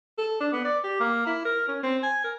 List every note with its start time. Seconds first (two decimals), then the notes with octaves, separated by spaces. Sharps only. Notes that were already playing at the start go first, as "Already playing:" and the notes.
0.19 A4
0.41 D4
0.53 B3
0.65 D5
0.84 G4
1.00 A#3
1.27 E4
1.45 A#4
1.68 C#4
1.83 C4
2.03 G#5
2.24 A#4